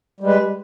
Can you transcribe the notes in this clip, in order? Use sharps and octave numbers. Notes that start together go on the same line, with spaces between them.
G3 G#3 B4